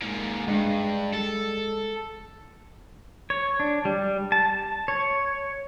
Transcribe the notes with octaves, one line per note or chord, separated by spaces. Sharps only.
G#2 A#3
G2 G#3
A4
C#5
D4
G3
A5
C#5